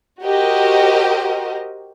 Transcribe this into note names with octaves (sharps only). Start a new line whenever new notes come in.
F#4 G4 A#4 C5 D#5